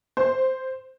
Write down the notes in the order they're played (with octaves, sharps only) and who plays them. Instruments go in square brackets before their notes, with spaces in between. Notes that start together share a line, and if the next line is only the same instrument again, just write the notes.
[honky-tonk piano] C5